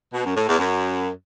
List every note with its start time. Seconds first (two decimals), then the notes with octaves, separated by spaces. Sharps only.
0.13 B2
0.24 F#2
0.36 A2
0.47 E2
0.58 F#2